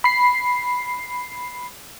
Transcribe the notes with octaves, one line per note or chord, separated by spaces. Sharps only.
B5 C7